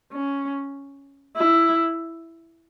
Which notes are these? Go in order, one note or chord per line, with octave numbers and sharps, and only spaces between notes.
C#4
E4